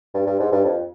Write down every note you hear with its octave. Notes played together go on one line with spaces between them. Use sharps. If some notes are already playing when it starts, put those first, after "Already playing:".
G2
G2
G#2
G2
F2